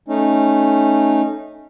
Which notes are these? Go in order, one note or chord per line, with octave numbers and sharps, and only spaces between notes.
A3 C#4 D#4